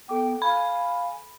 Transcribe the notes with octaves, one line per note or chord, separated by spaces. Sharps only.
B3 A4 G5 D6
F5 G#5 B5